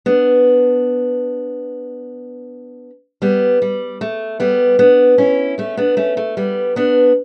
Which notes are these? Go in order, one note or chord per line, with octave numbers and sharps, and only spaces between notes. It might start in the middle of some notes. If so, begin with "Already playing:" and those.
B3 D4
G3 B3
G3
A3
G3 B3
B3 D4
C#4 E4
A3 C#4
B3 D4
A3 C#4
A3
G3 B3
B3 D4